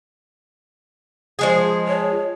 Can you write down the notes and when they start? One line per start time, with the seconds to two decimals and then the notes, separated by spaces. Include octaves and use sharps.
1.39 F3 G#3 G#4
1.87 C#5